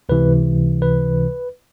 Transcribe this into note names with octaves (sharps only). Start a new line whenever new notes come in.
C#2 C3 E3 B4
B4